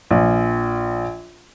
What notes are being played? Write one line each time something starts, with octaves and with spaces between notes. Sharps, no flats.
A#1